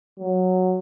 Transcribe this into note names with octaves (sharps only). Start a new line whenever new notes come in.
F#3